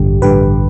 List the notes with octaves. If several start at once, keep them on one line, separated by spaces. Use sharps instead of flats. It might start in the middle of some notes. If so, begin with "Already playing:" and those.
Already playing: A1 G2 D3 G4
A1 G2 D3 G4 B4